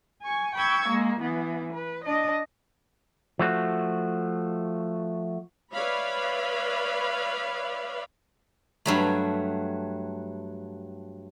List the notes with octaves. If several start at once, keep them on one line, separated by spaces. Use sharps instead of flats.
G#5 C#6
G5 B5 C#6 E6 G#6
G#3 A#3
E3 B3
B4
D4 D#5
F3 A3 F#4
B4 C#5 D5 E5 F5 B5
G2 F#3 A3